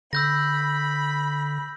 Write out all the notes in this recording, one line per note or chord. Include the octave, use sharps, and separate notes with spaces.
D3 B5 E6 G6 A#6